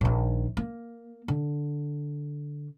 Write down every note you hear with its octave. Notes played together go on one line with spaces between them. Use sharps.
A#1 D#3
A#3
D3